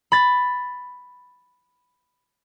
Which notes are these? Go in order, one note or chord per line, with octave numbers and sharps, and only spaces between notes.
B5 A6